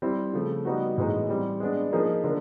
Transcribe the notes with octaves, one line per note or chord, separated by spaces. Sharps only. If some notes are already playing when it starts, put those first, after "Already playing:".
G3 C4 E4
C#3 F3 A3
G3 B3 D#4 F#4
A2 E3 G#3 B3 D#4
E3 G3 C4
G#3 B3 D4
F3 A#3 D#4 G#4
D3 F3 A#3 D4